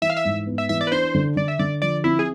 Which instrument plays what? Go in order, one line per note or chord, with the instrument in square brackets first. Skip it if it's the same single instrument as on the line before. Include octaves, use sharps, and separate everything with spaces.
[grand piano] E3 [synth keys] E5
[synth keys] F5
E5
[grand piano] G#2
B3
[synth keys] E5
[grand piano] E3 [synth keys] E5
[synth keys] D5
B4
[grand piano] D4 [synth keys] C5
[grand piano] D3
[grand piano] D3 [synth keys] D5
[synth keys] E5
[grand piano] D3 [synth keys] D5
[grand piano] F3 [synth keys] D5
[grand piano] C4 [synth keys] E4
[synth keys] G#4